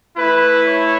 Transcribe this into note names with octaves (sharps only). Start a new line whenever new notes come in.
A3 E4 B4
C#5